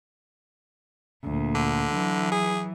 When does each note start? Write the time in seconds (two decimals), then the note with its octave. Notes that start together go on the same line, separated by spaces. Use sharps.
1.23 D2 A#2
1.55 D3
1.93 E3 F#3
2.32 G#4